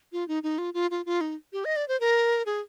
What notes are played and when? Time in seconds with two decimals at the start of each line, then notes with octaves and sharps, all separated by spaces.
0.12 F4
0.28 D#4
0.43 D#4
0.58 F4
0.74 F4
0.91 F4
1.06 F4
1.21 D#4
1.53 G4
1.65 D#5
1.76 D5
1.88 C5
2.00 A#4
2.46 G#4